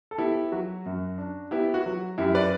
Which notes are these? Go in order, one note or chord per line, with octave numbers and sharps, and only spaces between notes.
A4
B3 E4 G4
F#3 F#4
F#2
D4
B3 E4 G4
F#4
F#3
F#2 E4 G4
B4 D5